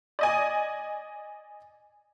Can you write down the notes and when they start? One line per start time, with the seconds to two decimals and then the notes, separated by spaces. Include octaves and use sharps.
0.19 D5 D#5 G#5